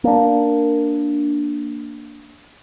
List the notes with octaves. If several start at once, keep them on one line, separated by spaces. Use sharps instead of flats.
A#3 D4